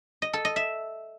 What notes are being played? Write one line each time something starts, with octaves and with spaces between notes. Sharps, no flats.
D#5
A4
D#5
E5